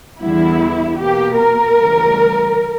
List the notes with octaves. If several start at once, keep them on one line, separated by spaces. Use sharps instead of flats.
E2 D3 G3 B3 E4
B2 A#3 G4
A#4
D2 C#3 E3 G3